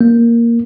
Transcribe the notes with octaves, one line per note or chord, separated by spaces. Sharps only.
A#3